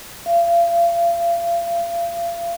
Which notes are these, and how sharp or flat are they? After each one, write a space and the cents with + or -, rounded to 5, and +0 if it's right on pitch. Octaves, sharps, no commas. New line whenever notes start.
F5 -35